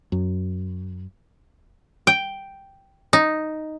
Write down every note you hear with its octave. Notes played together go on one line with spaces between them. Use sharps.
F#2
G5
D#4